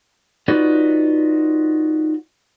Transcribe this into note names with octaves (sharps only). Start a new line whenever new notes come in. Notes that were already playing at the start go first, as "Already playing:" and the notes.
D#4 F4 F#4 B4 C#5 D5